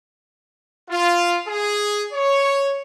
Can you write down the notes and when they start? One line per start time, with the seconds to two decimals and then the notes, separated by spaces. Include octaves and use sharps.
0.90 F4
1.48 G#4
2.13 C#5